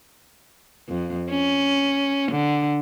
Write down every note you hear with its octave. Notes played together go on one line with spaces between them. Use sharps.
F2
C#4
D3